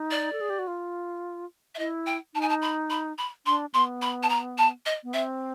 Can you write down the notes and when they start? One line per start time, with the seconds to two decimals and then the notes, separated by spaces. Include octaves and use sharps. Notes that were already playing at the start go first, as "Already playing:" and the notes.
Already playing: D#4
0.11 D5
0.33 A4
0.41 G#4
0.50 G4
0.59 F#4
0.67 F4
1.75 E5
1.79 E4 D#5
2.06 G5
2.35 D#4 A5
2.41 G#5
2.49 A5
2.62 B5
2.90 B5
3.18 B5
3.46 D4 C6
3.74 B3 C6
4.02 B5
4.23 A5
4.29 A#5
4.58 A5
4.86 D#5
5.04 B3
5.13 C4 E5